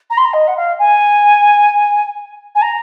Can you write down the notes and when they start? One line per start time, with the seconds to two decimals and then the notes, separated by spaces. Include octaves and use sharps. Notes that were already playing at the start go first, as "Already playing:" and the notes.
0.10 A#5
0.17 C6
0.25 A#5
0.33 D#5
0.47 F#5
0.56 F5
0.79 G#5
2.55 G#5
2.62 A#5